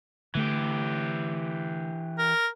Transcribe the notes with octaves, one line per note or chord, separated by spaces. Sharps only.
D3 E3 A3 G4
A#4